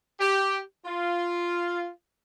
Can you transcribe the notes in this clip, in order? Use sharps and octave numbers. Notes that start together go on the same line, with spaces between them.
G4
F4